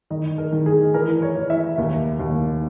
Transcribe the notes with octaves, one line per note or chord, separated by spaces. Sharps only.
D#3 D#5
A#4
D#3
G#4
E3 A#4
C#5
E3
E5
D#2
D#2